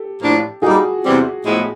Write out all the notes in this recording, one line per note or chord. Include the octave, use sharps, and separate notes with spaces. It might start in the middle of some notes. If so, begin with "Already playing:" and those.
Already playing: G4 A4
A2 F3 A#3 D4
G3 A#3 D#4 F#4 G#4
E2 C3 E3 G3 C4
A2 F3 G#3 B3 E4